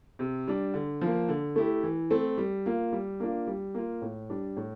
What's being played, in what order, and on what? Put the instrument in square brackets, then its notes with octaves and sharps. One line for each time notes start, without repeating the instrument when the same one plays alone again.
[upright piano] C3
G3 D4
D3
F3 A#3
D3
A3 E4 G4
E3
A3 C4
G3
A#3 F4
G3
A#3 D4 F4
G3
A#3 F4
A2
G3 D4
A2